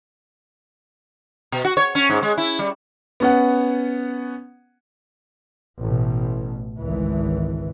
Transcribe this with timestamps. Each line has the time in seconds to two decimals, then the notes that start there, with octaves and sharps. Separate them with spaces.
1.52 B2
1.65 F#4
1.77 C#5
1.95 C#4
2.09 G#2
2.23 G#3
2.38 E4
2.59 G3
3.20 B3 C#4 F#5
5.80 A1 B2
6.78 G#1 C#2 E3